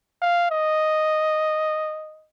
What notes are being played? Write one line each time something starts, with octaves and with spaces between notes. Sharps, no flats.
F5
D#5